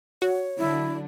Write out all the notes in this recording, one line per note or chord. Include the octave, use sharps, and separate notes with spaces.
F#4 C#5
D3 F#3 D4 E4